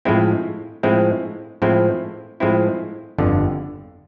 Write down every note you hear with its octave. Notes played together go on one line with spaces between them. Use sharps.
A2 F3 G#3 C4 E4
A2 F3 G#3 C4 E4
A2 F3 G#3 C4 E4
A2 F3 G#3 C4 E4
G1 F2 D3